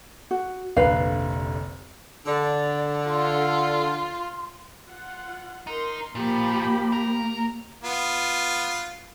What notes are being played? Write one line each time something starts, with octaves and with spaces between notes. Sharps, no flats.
F#4
F1 A#1 D3 B4 F5
D3 D5
F4 C6
F4 F#5
D#4 A#4 C6
A#2 F3 A#3 G4 B5
A#4
B3 F4